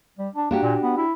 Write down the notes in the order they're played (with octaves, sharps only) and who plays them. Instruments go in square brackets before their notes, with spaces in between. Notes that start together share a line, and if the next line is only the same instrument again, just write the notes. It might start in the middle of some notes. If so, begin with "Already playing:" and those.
[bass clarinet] G3
D4
[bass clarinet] A#3 [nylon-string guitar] D4 F#4 G4
[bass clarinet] A#2
B3
E4